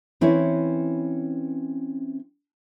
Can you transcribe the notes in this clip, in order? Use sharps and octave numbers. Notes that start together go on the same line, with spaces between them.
E3 C4 C#4 E4 B4 C#5